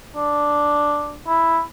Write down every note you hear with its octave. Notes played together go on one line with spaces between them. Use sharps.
D4
E4